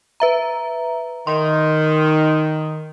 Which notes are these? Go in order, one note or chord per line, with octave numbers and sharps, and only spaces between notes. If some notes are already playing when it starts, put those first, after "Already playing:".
B4 E5 A#5
D#3 C6